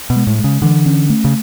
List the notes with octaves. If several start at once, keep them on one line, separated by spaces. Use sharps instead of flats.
B2
G#3
A2
G#3
C#3
D3 E3
C#4
A3
C#3